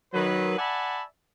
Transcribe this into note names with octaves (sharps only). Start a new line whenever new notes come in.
D#3 F#3 B4
D5 E5 F#5 G#5 A5 B5